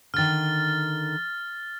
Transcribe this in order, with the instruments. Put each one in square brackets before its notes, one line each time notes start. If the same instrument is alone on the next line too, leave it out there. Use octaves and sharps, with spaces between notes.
[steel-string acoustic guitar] D3 D#3 [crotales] F6 A6